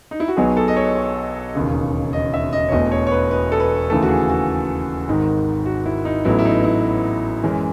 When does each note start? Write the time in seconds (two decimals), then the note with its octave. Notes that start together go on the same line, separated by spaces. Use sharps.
0.11 D#4
0.20 E4
0.28 F#4
0.37 B1 B2 F#3 B3 G#4
0.57 A4
0.68 D#5
0.76 C#5
0.96 C#5
1.55 E1 D#2 C#3
2.13 D#5
2.34 E5
2.53 D#5
2.69 C#5
2.72 E1 E2 B2 A3 D#5
2.92 C#5
3.07 C#5
3.11 B4
3.31 B4
3.52 A4
3.60 B4
3.90 D#2 C#3 E3 A3 A4
4.02 F#4
4.09 G#4
4.30 F#4
5.07 G#1 G#2 D#3
5.66 F#4
5.86 E4
6.05 D#4
6.25 A1 A2 F#3 B3 E4
6.39 E4
6.45 D#4
6.64 E4
7.43 F#2 E3 G#3 C#4